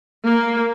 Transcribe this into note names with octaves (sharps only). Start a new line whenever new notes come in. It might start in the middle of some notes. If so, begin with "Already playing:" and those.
A#3